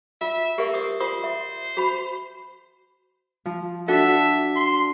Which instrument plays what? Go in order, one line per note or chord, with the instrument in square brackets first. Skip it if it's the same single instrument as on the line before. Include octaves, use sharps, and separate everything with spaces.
[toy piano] F4 [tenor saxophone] E5
[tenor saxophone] A#3 [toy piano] G4 A#4 E5
[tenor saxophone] C5 [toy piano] D#6
[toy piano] F4 C6 D#6 [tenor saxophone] C5
[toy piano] E5
F#4 B5
[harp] F3
[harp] D4 F#4 A4 [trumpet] E5
[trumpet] C6